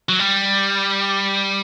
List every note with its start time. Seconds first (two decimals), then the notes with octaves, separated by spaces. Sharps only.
0.09 F#3
0.19 G3